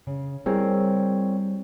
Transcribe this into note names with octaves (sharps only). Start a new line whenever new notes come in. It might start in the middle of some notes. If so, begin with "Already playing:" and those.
C#3
G3 C4 E4 G#4 A#4 C#5